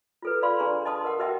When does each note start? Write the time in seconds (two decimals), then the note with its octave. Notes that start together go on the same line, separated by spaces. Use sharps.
0.22 F4 A4 B4
0.42 D5 F5 B5 C6
0.59 D4 G#4 A#5 C#6
0.85 D#5 A5 C6 D#6
1.04 A#4 F#5
1.19 F#4 A#4 D#5 E5 F#5 G5